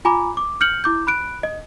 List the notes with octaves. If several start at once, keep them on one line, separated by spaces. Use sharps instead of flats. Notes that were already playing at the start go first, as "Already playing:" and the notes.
F4 G#5 A#5 B5 D6
D6
F6 G6 C#7 F#7
E4 D6 G6
B5 F#6 D7
D#5